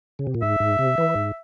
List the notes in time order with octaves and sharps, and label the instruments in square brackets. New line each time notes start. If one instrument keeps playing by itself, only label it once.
[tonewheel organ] C#3
C3
A#2
[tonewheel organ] G#2 [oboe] E5
[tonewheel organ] G#2
C3
E3
G#2